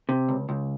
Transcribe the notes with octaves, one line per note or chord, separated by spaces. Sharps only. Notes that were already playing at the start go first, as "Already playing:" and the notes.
C3
C#2
C#2